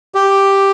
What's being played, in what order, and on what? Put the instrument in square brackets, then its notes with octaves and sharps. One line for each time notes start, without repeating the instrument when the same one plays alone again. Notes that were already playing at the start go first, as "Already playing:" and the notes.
[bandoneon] G4